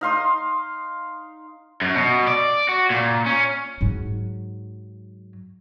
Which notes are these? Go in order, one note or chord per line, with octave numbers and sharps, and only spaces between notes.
D#4 F5 C6 D#6
F#2
B2
D5
F#4
A#2
C#4
G#2 F#3